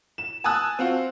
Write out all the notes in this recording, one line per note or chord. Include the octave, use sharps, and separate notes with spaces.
E7
G#5 A5 D#6 E6 F#6
C4 F4 F#4